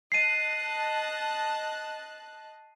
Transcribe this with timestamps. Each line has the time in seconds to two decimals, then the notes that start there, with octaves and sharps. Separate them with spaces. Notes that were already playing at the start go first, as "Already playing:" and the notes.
0.12 D#5 A5 F#6 C7 D#7